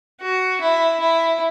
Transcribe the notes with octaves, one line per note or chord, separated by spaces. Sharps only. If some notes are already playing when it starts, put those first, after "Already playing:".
F#4
E4
E4